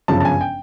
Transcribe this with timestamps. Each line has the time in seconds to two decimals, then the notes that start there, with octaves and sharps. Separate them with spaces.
0.08 G1 F#2 C#3 F3 A5
0.20 A5
0.25 G#5
0.41 G5